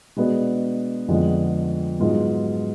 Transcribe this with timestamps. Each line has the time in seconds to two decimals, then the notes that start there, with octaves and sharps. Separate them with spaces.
0.17 B2 G#3 B3 D4 F#4
1.08 F2 D3 F3 G#3 B3
2.00 G#2 F#3 B3 F4 G#4